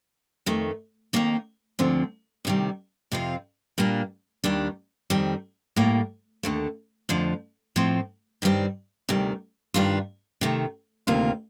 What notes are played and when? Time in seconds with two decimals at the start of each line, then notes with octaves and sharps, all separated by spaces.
0.46 F2 D#3 A3
1.13 F2 D#3 A#3 D#4
1.79 D2 D3 F3 C4
2.45 D2 C3 D#3 G3
3.12 F2 C3 F3 C4 F4
3.78 A#2 G3 A#3 D4
4.44 D#2 D#3 G3 D4
5.10 F2 D#3 G3 C4
5.76 A2 G3 A#3
6.43 D#2 D3 A3
7.09 F2 D3 F3 A3
7.76 A2 F3 C4
8.42 G2 D#3 G3 C4
9.09 D2 C3 D#3 G3
9.74 G2 D#3 G3 D4 F4
10.41 C3 D#3 A3
11.07 D2 C3 D#3 A#3 F4